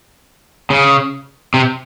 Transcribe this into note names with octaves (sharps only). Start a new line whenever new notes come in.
C#3
C3